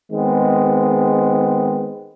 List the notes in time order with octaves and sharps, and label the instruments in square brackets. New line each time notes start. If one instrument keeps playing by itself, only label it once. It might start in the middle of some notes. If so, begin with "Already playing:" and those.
[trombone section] D#3 G#3 B3 C4